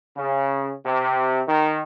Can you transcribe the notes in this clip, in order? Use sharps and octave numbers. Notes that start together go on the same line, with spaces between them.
C#3
C3
D#3